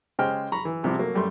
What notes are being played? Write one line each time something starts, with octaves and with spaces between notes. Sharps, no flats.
C#3 G#3 G4 C5 G5 F6
A#5 B5 C#6
E3
A1 C3 F3 G3 C4 D6
F#3 A3 A#3
F#2 G3 A3 C6